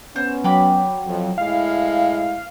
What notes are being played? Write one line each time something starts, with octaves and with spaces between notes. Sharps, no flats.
B3 C#4 C5
F#3 G5 B5 D6
F2
A2 G#3 E4 F5